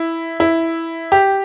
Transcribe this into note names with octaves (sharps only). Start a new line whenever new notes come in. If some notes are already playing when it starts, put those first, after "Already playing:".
Already playing: E4
E4
G4